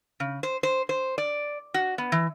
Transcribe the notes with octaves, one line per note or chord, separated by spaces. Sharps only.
C#3
C5
C5
C5
D5
F#4
B3
E3